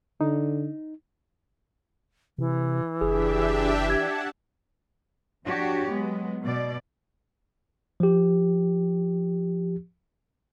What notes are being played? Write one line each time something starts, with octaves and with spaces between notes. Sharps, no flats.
D3 D#4
C3 E3
F#1 D4 G4 G#4 E5
F#5 A5 G#6
F2 D4 F#4 G4 C#5
F#3 G#3 B3
B2 D5
F3 G4